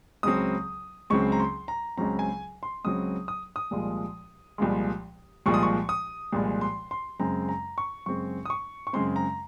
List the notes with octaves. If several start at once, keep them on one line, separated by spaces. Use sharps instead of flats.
C#2 C#3 F#3 C4 D#6
C#2 C#3 F#3 C4 C#6
A#5
C6
A#5
C#2 C#3 F#3 C4 A#5
G#5
C6
C#2 C#3 F#3 C4 D#6
D#6
D#6
C2 A#2 F3 G#3
C2 A#2 F3 G#3
C2 A#2 F3 G#3 C#6
D#6
C#6
D#6
C2 A#2 F3 G#3
C6
C6
F#2 C#3 G#3 C4 A#5
A#5
C#6
F#2 C#3 G#3 C4 C#6
D#6
C#6
C#6
F#2 C#3 G#3 C4 C6
A#5